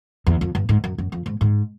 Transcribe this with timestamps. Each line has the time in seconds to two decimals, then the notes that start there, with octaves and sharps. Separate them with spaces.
0.27 E2
0.41 F2
0.55 G2
0.69 G#2
0.84 F#2
0.98 F#2
1.12 F2
1.26 G#2
1.41 G#2